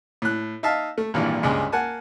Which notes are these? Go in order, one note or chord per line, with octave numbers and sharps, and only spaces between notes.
A2 F#6
D#4 E5 F5 A5
A3
G#1 A#2 E3 G3 D4
C#2 G2 G#3
A#3 F#5 G#5 A5